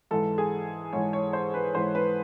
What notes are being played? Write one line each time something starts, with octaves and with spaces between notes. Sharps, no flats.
G#2 E3 A4
G#4
G#2 E3 C#5
C#5
C5
B4
G#2 E3 C5
B4